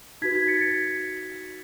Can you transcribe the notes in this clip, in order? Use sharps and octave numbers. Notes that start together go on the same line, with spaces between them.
D#4 F#4 B4 G#6 B6
G#6 B6
A6 C#7
A6 C#7